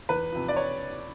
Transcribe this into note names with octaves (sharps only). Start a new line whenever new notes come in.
E2 B4
C3 F3
D5
C#5